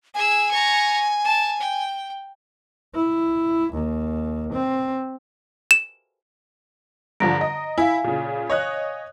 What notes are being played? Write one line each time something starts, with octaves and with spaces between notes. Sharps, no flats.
G#4 G#5 E6
A#5 C#6
A5
G5
E4
D#2
C4
E7
G2 D3 F3 A#5 A#6 D7
D#5
E4 F5 G#5
A#2 C#3
C#5 D#5 F#6